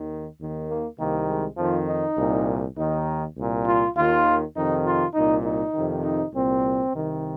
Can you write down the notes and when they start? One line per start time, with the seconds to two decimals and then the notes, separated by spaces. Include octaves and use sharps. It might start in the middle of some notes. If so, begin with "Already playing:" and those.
Already playing: D#2 D#3
0.38 D#2 D#3
0.67 A#3
0.97 C2 C3 D#3 A#3
1.27 G#3
1.57 F2 D#3 F3
1.87 D#4
2.17 C2 A#2
2.76 D#2 D#3 D#4
3.36 C2 A#2
3.66 F4
3.95 D#2 D#3 F4
4.55 F2 C3 D#3 D#4
4.85 F4
5.14 C2 A#2 D#4
5.44 D#4
5.74 F2 C3 D#3
6.04 D#4
6.33 C2 A#2 C4
6.93 C2 C3 D#3